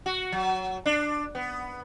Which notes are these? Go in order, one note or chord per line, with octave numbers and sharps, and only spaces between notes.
F#4
F#3
D4
B3